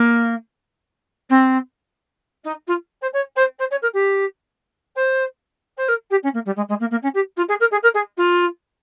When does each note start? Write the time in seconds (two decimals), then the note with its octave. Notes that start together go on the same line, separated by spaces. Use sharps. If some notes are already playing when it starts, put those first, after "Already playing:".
Already playing: A#3
1.29 C4
2.44 D#4
2.67 F4
3.01 C5
3.13 C#5
3.36 C5
3.59 C5
3.71 C#5
3.82 A#4
3.93 G4
4.96 C5
5.77 C5
5.88 A#4
6.10 G4
6.23 C#4
6.33 A#3
6.45 G3
6.56 G#3
6.68 G#3
6.80 A#3
6.90 A#3
7.02 C#4
7.14 G4
7.37 F4
7.48 G#4
7.60 A#4
7.71 G#4
7.82 A#4
7.94 G#4
8.17 F4